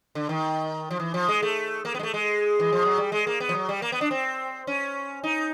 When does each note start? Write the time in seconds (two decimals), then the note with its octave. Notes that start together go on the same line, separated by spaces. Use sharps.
0.15 D3
0.29 D#3
0.91 F3
0.99 E3
1.14 F3
1.28 G#3
1.43 A3
1.85 A#3
1.94 B3
1.99 G#3
2.03 A3
2.14 G#3
2.60 E3
2.73 F3
2.85 F#3
2.98 G3
3.12 G#3
3.27 A#3
3.40 B3
3.49 F3
3.55 F#3
3.69 G3
3.82 A#3
3.92 B3
4.01 D4
4.11 C4
4.67 C#4
5.24 D#4